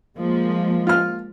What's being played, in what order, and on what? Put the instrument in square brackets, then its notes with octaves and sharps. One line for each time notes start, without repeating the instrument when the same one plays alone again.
[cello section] F3 G#3 A#3
[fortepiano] F4 F6